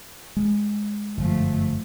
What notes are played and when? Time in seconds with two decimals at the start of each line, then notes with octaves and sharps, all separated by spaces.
0.37 G#3
1.17 G1 F#2 F3 A3